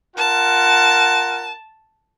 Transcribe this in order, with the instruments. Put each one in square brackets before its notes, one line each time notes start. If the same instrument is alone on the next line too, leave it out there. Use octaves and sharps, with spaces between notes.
[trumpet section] F4 A#4 F#5 [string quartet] A5